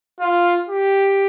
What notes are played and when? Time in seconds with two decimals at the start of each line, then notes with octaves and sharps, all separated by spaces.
0.20 F4
0.69 G4